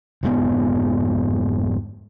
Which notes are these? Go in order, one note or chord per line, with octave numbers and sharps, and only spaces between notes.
F1 G#2 B3